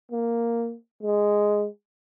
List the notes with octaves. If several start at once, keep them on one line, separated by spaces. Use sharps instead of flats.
A#3
G#3